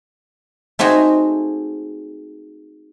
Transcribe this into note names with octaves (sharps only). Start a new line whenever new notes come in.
A3 C4 D#4 F#4 G#4